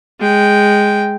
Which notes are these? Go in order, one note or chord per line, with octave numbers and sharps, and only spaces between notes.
G#3 G5